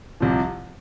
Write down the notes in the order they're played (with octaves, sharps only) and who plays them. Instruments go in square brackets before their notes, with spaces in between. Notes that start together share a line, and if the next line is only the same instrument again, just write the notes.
[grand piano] C2 C3 F3